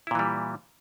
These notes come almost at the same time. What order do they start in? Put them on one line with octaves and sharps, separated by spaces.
E4 A#2 E3 G3